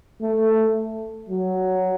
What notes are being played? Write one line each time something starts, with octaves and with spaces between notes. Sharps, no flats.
A3
F#3